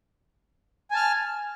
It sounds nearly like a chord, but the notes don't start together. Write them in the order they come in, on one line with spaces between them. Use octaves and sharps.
G#5 A5 F6